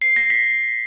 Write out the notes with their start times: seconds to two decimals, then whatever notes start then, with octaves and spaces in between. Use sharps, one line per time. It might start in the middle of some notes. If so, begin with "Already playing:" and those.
0.02 C7
0.16 A#6
0.30 B6